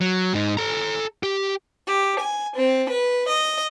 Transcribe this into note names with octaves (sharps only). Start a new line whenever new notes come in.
F#3
G#2 D#4
A4 A#5
G4
G4
G#5
C4
B4
D#5